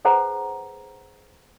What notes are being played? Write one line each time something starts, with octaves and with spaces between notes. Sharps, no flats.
D#4 G#4 B4 C5 F#5 A#5